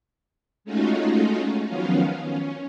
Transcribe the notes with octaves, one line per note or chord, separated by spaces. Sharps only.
G#3 A3 C#4 D#4 F4 F#4
D#3 F3 F#3 B3 C#4 F4
C#4